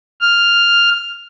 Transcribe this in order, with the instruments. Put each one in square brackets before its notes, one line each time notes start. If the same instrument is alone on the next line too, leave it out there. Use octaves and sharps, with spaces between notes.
[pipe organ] F6